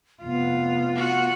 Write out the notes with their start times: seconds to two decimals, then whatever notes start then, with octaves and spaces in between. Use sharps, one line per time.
0.24 F1 B3 F4
0.96 F#4 F#5